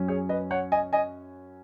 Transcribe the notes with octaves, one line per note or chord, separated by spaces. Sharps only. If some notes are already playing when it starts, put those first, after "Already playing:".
Already playing: F#2 F#3 C#4
G#4 C#5
B4 D#5
C#5 F#5
D#5 G#5
D#5 G#5